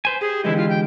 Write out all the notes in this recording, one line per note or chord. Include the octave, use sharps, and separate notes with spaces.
B4 C5 G#5
G4 G#4
D3 E3 G#3 E4
F4
G5